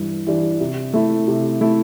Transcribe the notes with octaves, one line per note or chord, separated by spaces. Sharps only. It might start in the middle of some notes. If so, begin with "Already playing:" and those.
Already playing: G2 E3 G3 D4
E3 G3 D4
C3
A3 E4
C3
A3 E4